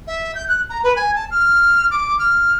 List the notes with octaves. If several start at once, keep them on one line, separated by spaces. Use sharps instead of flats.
E5
G6
F#6
A#5
B4
G#5
A5
F6
D6
F6